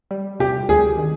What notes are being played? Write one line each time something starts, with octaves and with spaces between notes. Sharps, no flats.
G3
C3 G4
D2 G#4
D#3